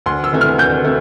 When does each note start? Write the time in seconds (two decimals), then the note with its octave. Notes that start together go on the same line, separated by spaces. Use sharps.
0.06 D2 C6
0.24 E6
0.33 C3 E3 A3
0.41 F6
0.58 D2 G6
0.85 C3 A3